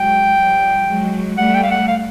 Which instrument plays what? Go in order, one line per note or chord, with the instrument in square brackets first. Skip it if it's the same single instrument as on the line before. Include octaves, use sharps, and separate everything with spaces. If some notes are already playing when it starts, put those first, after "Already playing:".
Already playing: [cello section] F#3 G#3 [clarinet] G5
[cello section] F3 G3
F#3 G#3
[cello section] G3 A3 [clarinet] F#5
[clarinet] G5
F5
F#5
F5